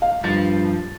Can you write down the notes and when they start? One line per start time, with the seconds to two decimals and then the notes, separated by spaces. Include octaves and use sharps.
0.02 F5
0.24 G2 F3 A6